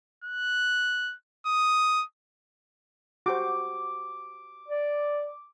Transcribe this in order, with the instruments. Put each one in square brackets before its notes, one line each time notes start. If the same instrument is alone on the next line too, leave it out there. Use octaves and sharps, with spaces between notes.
[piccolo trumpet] F#6
D#6
[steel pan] F#4 G4 C5 [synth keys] D6
[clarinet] D5